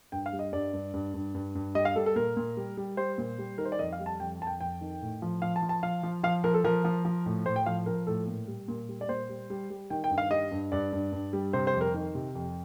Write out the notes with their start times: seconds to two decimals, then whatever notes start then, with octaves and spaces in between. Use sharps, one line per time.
0.12 G2 G5
0.26 F5
0.33 G3
0.39 D#5
0.53 G2 D5
0.73 G2
0.94 G2
1.14 G2
1.35 G2
1.55 G2
1.75 G3 D#5
1.85 F5
1.96 G3 A4
2.06 A4
2.16 A#2 A#4
2.37 A#2
2.57 G3
2.77 G3
2.97 G3 C5
3.18 A#2
3.38 G3
3.58 D#3 A#4
3.65 C5
3.72 D5
3.79 F2 D#5
3.93 F5
4.00 G3
4.06 A5
4.20 F2 G5
4.40 F2 A5
4.47 G5
4.61 F2 G5
4.81 D#3
5.02 A2
5.22 F3
5.42 F3 F5
5.56 A5
5.62 F3
5.69 A5
5.83 F3 F5
6.03 F3
6.23 F3 F5
6.44 F3 A#4
6.54 A4
6.64 F3 A#4
6.85 F3
7.05 F3
7.26 A2
7.46 A2 C5
7.56 G5
7.66 F3 F5
7.86 F3 A#4
8.07 A2 A4
8.27 A#2
8.48 G3
8.68 A#2
8.89 G3
9.01 D5
9.09 A#2 C5
9.29 G3
9.50 G3
9.70 G3
9.90 D#3 G5
10.04 G5
10.11 G2
10.18 F5
10.31 G3 D#5
10.51 G2
10.72 G2 D5
10.93 G2
11.12 G2
11.33 G3
11.53 C3 C5
11.67 C5
11.73 F2
11.81 A#4
11.94 D#3
12.15 C3
12.35 F2